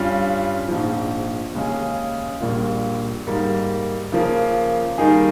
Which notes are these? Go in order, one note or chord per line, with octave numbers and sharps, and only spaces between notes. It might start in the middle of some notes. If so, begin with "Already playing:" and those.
Already playing: G2 G3 C#4 F4
A#1 G#2 F3
D#2 C#3 G#3 C#4 G#4
A#1 A#2 G3 A#3 F4
G#2 G3 A#3
C#3 F3 A#3
D#3 G3 A#3 D#4 G#4